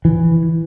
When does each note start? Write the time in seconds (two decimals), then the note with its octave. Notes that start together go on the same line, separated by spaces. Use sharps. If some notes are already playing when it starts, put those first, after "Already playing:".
0.05 E3